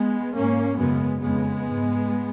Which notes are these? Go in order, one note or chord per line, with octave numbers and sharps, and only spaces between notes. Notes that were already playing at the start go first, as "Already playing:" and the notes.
Already playing: G#3 B3
G#2 A#3 C#4
F#2 C#3 G#3 B3
F2 C#3 G#3 B3
G#2